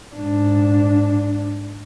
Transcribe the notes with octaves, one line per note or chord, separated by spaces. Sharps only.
G#2 D4